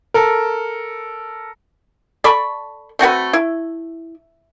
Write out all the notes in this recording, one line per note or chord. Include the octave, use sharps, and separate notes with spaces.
A4 A#4
A4 D5 B5 C#6
A3 C4 F#4 B4
E4